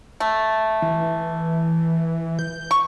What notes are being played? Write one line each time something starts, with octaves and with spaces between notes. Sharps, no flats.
A3
E3
G6
C#6